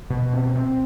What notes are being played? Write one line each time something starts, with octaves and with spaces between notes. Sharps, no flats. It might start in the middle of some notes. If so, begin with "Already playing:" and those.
B2
C4
C4